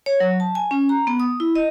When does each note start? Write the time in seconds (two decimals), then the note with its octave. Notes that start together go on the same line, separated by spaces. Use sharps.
0.06 C#5
0.20 F#3
0.40 A5
0.55 G#5
0.71 C#4
0.89 A#5
1.07 B3
1.20 D#6
1.40 E4
1.55 D#5